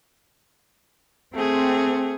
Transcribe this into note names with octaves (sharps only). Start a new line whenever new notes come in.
A3 C4 G#4